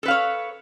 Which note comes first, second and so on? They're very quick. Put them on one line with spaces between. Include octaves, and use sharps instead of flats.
A4 B4 F5 C#5